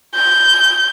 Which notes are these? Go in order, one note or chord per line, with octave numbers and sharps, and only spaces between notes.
G6